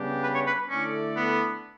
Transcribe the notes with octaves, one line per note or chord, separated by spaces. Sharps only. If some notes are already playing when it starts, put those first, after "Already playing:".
Already playing: C#3 G3 B3 D4 G4
B4
C#5
B4
D3 A3 C#4 E4 A4 D5
B3